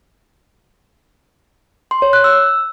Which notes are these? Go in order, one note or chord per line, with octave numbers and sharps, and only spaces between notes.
C6
C#5
F#6
E6